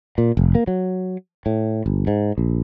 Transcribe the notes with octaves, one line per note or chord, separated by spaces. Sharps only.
A#2
F1
A#3
F#3
A2
G1
G#2
A#1